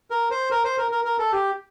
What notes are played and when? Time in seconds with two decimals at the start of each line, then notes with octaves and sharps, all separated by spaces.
0.10 A#4
0.31 C5
0.51 A#4
0.64 C5
0.78 A#4
0.91 A#4
1.05 A#4
1.19 A4
1.32 G4